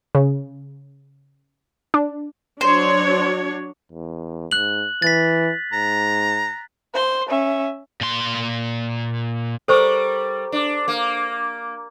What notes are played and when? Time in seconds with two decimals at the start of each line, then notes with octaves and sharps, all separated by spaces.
0.15 C#3
1.94 D4
2.61 F#3 D4 C5 C#5
3.92 E2
4.51 G#2 F#6 F#7
5.02 E3 A6 B6
5.73 G#2 A#5
6.94 C5 C6
7.29 C#4 E5
8.01 A#2 C6
9.68 G3 A4 A#4 C5 C#6
10.52 D4
10.88 A#3